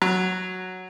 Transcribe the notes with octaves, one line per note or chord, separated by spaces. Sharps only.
F#3